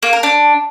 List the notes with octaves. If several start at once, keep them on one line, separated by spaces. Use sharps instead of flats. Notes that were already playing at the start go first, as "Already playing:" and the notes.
A#3
A#4
D4